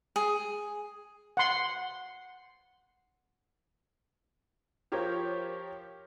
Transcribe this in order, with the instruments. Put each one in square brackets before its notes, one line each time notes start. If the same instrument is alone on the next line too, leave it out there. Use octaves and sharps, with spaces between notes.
[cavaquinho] G#4
[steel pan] F#5 C6
[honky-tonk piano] F3 G4 A#4 C5 C#5